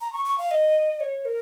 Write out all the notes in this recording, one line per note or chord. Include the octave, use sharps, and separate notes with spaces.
A#5
C#6
C#6
F5
D#5
C#5
A#4